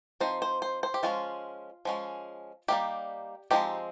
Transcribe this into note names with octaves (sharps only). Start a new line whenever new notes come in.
F3 C4 D#4 C5
C5
C5
C5
G4
F3 G#3 C#4 F4
F3 G#3 C#4
G3 A#3 D#4 G4
F3 G#3 C4 D#4 G4